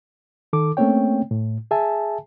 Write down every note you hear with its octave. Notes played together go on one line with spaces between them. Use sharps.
D#3 A4 D6
A3 A#3 C4 C#4 C#5 G5
A2
G#4 E5 G#5 A5